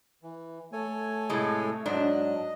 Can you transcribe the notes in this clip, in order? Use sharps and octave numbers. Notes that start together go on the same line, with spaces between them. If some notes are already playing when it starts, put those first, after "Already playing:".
E3
A3 A4 C#5 G#5
A2 C3 G#3
G#2 F#3 D4 D#5